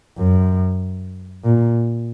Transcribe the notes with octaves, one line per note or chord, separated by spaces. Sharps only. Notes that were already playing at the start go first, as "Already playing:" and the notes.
F#2
A#2